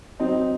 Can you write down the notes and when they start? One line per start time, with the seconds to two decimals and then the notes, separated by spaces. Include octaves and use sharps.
0.20 F#3 C4 D#4